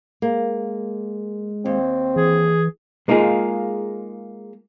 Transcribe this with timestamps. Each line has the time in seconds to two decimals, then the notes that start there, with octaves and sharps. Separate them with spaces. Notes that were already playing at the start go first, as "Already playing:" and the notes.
0.22 G#3 A#3
1.65 D#2 C4
2.16 E3 G#4
3.08 G#3 A#3 D#4 F4 G#4